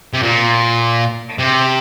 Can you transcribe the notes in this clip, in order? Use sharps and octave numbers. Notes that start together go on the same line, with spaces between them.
C3
A#2
C3